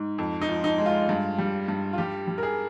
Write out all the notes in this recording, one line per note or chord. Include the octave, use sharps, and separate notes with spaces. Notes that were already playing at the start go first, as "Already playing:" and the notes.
Already playing: G#2
F2
D#4
F3
D#4
G#3
F4
G2
G3
G2
F4
G3 G4
G3
A#4
G#4